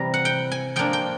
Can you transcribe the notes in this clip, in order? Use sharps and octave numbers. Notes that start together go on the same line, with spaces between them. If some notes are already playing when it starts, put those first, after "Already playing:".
Already playing: C3 E3 G3 A#5
F#5
G5
G#5
F3 A#3 D4 G5
G5